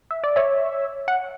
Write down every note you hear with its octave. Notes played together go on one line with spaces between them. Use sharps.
E5
D5
C#5 E5
F#5